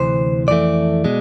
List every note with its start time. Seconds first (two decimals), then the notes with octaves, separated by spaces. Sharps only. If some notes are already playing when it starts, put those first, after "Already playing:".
Already playing: D2 C3 E3 C5
0.48 F2 E3 A3 D5
1.05 B2 G#3